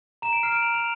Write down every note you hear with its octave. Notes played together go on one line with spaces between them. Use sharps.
A#5 E7
D7
F6 C7
D7
A#5 F7
F7